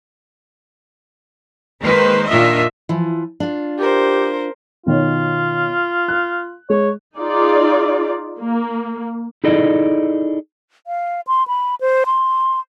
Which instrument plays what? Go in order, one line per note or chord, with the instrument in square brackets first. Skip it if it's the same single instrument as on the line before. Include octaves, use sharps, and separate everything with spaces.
[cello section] D#3 G#3 A#3 B4 C5
A#2 D#3 D4 F4 D#5 E5
[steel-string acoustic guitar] E3 F3
D4 F4
[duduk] G4 [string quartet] A#4 C5
[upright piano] B2 D#3 C#5 [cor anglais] F4
[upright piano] F#6
[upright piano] G#3 [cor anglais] C#5
[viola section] D#4 F4 G#4 D5
A#3
[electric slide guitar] D#4 E4 G#4 A4 D5 D#5
[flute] F5
C6
B5
C5
C6